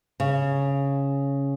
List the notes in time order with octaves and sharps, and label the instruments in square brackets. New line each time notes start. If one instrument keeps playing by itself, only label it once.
[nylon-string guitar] C#3